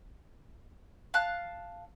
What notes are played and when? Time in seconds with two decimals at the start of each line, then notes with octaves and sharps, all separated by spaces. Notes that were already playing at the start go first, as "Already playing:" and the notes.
1.14 F5 A5 F#6